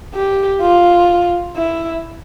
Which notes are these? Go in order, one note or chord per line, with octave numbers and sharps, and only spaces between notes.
G4
F4
E4